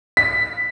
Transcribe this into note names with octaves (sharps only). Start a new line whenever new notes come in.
B6